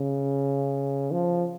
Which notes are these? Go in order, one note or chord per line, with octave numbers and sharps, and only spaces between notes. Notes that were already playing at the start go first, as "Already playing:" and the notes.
Already playing: C#3
F3